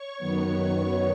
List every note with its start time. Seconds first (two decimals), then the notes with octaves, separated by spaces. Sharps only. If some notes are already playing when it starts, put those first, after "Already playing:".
Already playing: C#5 C#6
0.18 F#2 D#3 F#3 B3